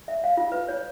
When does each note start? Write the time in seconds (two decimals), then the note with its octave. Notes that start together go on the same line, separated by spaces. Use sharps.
0.08 E5
0.24 F5
0.37 F4
0.52 B4
0.68 C#5